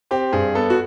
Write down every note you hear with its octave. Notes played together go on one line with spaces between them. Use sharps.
C4 G4
G2 G#4
B3 A4
F#4